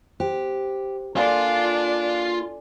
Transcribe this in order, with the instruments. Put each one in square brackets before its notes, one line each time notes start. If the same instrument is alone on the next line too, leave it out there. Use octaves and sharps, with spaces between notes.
[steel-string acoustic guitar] G4 [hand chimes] C5
[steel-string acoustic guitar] A#3 [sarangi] D4 [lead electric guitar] F4 F5 [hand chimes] A4 D5 G#5